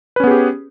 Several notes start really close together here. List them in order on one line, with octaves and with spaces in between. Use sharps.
B4 C#4 B3 G#4 G4